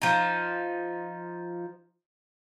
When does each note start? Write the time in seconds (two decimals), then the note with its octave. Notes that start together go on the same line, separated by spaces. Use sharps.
0.02 F3 D#4